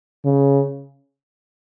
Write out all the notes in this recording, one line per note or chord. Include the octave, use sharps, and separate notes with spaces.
C#3